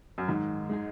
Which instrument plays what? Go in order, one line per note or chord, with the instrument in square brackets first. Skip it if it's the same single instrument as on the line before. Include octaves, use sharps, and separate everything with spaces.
[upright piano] F#2
[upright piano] G#2 [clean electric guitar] D#3
[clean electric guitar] G#3 D#4 G#4